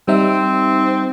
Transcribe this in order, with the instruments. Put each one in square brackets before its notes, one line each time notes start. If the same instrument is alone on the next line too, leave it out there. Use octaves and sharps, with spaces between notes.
[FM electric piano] G3 D#4 E5 [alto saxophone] C4